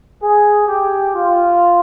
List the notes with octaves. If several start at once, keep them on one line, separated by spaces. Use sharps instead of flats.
G#4
G4
F4